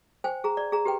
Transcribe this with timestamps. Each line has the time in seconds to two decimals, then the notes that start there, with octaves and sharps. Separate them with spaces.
0.24 C5 G5 G#5
0.44 G#4 A#5
0.57 D5
0.72 G#4 A#5
0.85 G4 B4 G5